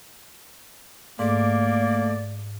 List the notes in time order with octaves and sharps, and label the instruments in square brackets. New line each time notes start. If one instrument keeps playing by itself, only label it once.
[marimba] G#2 [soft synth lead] A3 [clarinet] A#3 [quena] D5